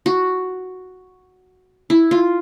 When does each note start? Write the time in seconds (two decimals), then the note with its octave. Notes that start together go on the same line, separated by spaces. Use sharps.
0.06 F#4
1.90 E4
2.11 F4